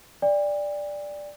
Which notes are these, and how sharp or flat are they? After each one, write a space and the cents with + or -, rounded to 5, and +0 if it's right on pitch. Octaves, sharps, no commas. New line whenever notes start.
D5 +0 G5 +40